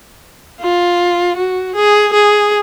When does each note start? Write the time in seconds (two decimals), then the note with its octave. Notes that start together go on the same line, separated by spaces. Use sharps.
0.61 F4
1.37 F#4
1.75 G#4
2.13 G#4